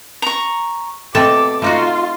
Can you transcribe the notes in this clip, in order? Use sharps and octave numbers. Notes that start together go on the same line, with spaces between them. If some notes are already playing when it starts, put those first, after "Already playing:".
A#5 C#6
B2 A3 C4 A4 D6
A3 D#4 F4 F#4